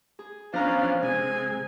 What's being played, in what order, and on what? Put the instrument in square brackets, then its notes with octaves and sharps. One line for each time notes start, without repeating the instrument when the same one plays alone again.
[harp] G#4
[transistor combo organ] F3 B3 D4 [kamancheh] C#4 F5 [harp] C5 A#5
[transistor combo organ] C3 G#3 [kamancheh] G#5